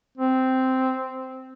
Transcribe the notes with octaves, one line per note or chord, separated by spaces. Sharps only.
C4